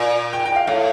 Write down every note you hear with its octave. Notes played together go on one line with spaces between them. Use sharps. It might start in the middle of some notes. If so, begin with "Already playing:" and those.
Already playing: A#2
G5
G5
F5
A2 F5